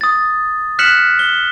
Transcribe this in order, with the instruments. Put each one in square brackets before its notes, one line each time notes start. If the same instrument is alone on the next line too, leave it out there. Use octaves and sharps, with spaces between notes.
[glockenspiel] D#6 A6
F6 F#6 B6 C#7 E7 F#7
G7